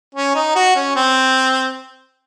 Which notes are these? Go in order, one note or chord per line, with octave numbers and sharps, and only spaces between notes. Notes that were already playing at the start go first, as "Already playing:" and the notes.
C#4
D#4
F#4
C#4
C4